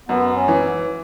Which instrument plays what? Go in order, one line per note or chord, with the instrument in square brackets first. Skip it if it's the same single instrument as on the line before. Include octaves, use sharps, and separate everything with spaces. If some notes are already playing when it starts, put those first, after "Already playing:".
[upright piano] F#2 [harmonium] B3
[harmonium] C#4
[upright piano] E3